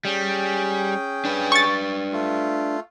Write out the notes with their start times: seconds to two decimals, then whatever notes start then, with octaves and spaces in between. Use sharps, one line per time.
0.05 G3 C#4 G#4 G5
1.25 D4 B4
1.52 C#6 A6
2.12 A3 F4